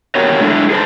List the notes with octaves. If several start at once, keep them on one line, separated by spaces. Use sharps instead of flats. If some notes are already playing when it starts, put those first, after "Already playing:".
B3 F#4 G4 A#4 C#5
G#3 D4 E4 G#4 A4
G#4 B4 C5 A5